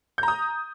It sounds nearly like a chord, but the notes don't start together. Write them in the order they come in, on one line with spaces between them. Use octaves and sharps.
G6 A#5 D#6